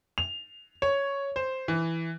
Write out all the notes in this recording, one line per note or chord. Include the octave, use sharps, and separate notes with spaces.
F7
C#5
C5
E3